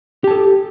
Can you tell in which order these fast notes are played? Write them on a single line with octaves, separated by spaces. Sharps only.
G4 A5 A4